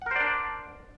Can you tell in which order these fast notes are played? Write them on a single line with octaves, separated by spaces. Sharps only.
F#5 A#4 C5 D5 D4